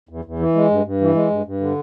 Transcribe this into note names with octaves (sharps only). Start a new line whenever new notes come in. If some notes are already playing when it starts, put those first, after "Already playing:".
E2
E2
E3
G#3
G2
G2
E3
G#3
G2
G2
D3